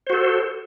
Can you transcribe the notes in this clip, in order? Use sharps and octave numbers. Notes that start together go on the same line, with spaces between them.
F#4 A4 C5